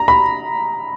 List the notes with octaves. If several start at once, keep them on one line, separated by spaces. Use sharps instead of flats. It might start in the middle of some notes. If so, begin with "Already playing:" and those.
Already playing: A#5
B5